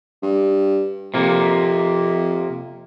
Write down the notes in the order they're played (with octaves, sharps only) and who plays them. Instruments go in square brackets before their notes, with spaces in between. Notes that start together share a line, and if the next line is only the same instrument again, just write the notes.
[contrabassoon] G2
[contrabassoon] F2 [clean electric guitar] C3 A#3